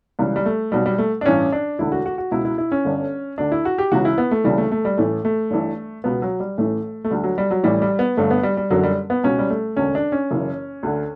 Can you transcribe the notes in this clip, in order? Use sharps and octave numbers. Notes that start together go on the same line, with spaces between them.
C#2 C#3 E3 G3
G3
A3
B1 B2 G3
G3
A3
D4
A1 G2 E3 C#4
D4
E1 D2 D3 E4
F#4
F#4
F#4
C#2 B2 E4
E4
E4
C#4
G1 G2 D3
D2 D3 D4
E4
F#4
G4
C#2 C#3 E3 F#4
E4
B3
A3
D2 C#3 E3 G3
A3
A3
G3
A1 A2 E3 A3
A3
G1 G2 E3
C#2 B2 B3
F#3
G3
A1 A2 E3 A3
A3
D2 D3 G3
F#3
G3
F#3
A1 A2 E3 G3
G3
B3
G1 G2 D3 A3
B3
G3
G3
F#1 F#2 D3 F#3
G3
B3
C#2 B2 C#4
G3
A3
E1 D2 D3 C#4
D4
C#4
F#1 F#2 C#3 E3
D2 D3